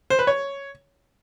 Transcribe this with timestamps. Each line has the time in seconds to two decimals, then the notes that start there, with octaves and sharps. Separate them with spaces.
0.10 C5
0.19 B4
0.27 C#5